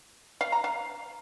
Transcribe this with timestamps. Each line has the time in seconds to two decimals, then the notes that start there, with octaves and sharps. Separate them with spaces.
0.41 F5
0.52 A#5
0.64 F5